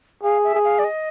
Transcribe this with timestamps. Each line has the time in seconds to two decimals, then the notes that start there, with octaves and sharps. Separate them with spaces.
0.23 G#4 F5
0.44 E5
0.54 G#4
0.65 F5
0.79 D5
0.84 D#5